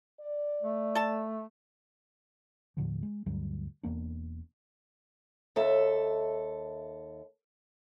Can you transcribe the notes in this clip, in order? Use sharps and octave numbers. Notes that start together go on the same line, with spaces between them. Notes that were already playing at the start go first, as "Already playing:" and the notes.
D5
A3
A4 A5
D#2 A2 D3 F3
G#3
D2 G2 F#3 G3
E1 E2 A#3 D4
D#2 A4 E5